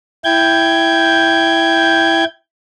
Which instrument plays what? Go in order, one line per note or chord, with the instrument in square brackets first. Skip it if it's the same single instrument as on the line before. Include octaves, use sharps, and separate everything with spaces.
[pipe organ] E4 G5 G6 G#6